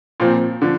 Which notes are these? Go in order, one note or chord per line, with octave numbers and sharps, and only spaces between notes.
A#2 F3 C4
D3 F3